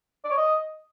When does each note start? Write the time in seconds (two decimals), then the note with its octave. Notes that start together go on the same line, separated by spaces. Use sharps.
0.24 D5
0.31 C#5
0.37 D#5